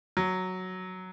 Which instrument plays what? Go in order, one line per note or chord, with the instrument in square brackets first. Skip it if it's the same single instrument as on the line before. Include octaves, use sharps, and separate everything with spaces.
[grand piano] F#3